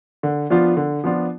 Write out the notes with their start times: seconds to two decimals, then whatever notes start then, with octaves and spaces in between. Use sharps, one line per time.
0.23 D3
0.50 F3 B3 D4 F4
0.77 D3
1.04 F3 B3 D4 F4